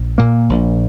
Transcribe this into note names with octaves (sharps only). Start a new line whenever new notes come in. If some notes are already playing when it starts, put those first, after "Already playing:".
Already playing: A#1
A#2 A#3
A#1